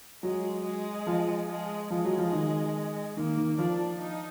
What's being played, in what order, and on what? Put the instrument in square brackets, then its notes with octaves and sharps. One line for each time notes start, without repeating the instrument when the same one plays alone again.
[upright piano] F#3 [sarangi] G#3
[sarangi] G#3
[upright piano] F3
[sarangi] G#3
[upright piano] F3 [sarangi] G#3
[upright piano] F#3
F3
D#3
[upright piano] D#3 [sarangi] A#3
[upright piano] D#3
[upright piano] F3 [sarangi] D4
[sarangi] D#4